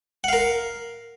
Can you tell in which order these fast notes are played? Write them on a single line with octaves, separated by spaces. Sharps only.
F#5 F5 A#4